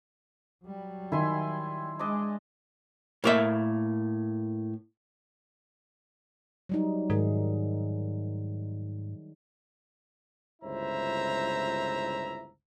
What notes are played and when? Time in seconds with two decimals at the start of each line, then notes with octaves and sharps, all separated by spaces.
0.64 F#3 G3
1.12 D#3 E4 G#5 C6
1.99 G#3 D4 D5 D#5
3.24 A2 A#3 E5
6.69 F#3 G3 D#4
7.10 G#2 D#3 G#4
10.62 G1 C#2 E4 C5 E5 A#5